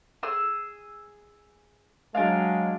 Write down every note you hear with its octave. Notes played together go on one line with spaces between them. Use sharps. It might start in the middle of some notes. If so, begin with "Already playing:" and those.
G#4 E6
F#3 G#3 D4 F5